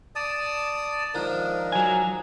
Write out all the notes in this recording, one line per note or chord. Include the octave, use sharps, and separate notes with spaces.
D5 A5 D#6
G#2 D#3 F3 D4 A#4
F#3 G#5